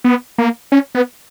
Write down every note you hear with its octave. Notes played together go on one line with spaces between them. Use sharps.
B3
A#3
C#4
B3